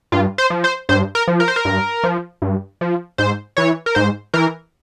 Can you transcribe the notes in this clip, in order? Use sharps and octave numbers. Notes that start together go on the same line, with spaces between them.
G2 F4
C5
F3
C5
G2 C5
A#4
F3
A#4
C5
A#4
G2
F3
G2
F3
G#2 C5
E3 C#5
A#4
G#2 C5
E3 A#4